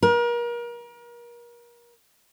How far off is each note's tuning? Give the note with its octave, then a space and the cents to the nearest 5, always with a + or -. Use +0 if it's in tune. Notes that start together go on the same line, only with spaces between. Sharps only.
A#4 +35